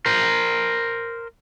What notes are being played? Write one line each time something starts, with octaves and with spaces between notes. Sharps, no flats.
A#4 C5